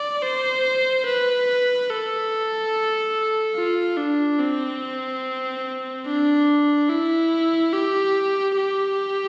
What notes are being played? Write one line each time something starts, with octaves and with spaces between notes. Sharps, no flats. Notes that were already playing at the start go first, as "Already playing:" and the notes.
Already playing: D5
C5
B4
A4
F4
D4
C4
D4
E4
G4
G4